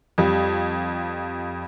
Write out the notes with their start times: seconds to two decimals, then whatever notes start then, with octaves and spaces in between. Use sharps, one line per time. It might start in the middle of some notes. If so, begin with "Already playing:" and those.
0.18 F2 G3